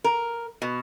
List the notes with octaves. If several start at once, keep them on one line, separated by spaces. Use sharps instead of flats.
A#4
B2